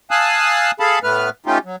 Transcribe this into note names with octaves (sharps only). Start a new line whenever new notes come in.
F5 G#5 A5 D#6 E6 F#6
G#4 A4 F5 A5 B5
A2 A3 B3 B4 F6
A3 C#4 D#4 F4 G4
F#3